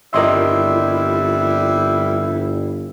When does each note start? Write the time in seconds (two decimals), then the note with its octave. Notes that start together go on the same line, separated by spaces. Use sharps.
0.14 G1 F2 G3 E4 A#4 D#5 E5 C6